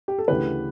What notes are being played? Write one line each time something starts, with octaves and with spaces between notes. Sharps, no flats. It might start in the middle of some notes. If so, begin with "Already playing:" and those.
G4
A4
D2 C#3 E3 G4 B4